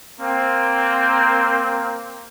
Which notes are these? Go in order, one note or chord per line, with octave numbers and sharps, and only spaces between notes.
A#3 C4